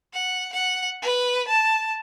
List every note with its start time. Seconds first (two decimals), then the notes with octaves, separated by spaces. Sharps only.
0.14 F#5
0.53 F#5
1.02 B4
1.48 A5